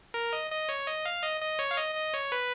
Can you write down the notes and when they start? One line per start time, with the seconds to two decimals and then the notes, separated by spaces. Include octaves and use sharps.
0.14 A#4
0.33 D#5
0.51 D#5
0.69 C#5
0.86 D#5
1.05 F5
1.24 D#5
1.41 D#5
1.59 C#5
1.71 F5
1.78 D#5
1.95 D#5
2.14 C#5
2.32 B4